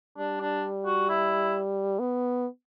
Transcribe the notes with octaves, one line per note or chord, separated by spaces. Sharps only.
G3 D4
D4
F#4
E4
B3